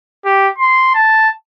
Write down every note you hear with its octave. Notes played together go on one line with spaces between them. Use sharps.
G4
C6
A5